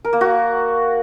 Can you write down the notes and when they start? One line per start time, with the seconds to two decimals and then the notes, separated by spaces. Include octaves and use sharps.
0.05 A#4
0.13 A#3
0.21 F#4